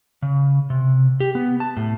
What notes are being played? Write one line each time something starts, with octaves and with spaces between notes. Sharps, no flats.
C#3
C3
G4
B3
A5
A2